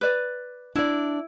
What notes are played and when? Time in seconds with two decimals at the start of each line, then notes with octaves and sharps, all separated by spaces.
0.01 B4 D5
0.75 D4 E4 D5